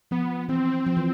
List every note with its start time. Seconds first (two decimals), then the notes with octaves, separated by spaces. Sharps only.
0.11 F3 B3
0.49 E3 C4
0.87 F3
0.96 E3